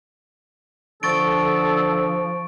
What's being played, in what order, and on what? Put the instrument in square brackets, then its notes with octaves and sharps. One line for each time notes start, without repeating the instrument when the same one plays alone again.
[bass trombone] D3 [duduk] F3 [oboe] A4 [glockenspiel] C#6 A6 D7